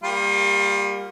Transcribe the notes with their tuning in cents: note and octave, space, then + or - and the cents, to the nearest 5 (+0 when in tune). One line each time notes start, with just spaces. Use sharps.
G3 +25 A#3 +0 F4 +40